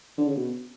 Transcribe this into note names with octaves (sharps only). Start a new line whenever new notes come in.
D3
C#3
B2